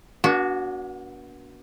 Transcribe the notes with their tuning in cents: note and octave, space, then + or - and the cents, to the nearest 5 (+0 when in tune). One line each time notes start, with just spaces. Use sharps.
B3 -45 D4 -30 F#4 +0